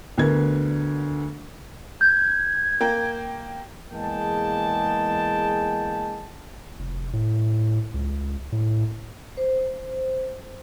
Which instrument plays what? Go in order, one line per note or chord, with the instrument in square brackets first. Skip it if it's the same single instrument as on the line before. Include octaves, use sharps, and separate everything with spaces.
[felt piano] D2 D3 B3 A#4 G#6
[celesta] G6 [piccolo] G#6
[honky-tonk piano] A#3 G5
[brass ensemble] E2 G#3 A#3 G#4 G5 A5
[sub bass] F1
A2
C#2
A2
[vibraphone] C5